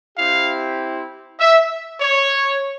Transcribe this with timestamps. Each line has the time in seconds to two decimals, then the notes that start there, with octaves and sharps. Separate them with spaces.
0.18 C4 E4 G4 F5
1.40 E5
2.01 C#5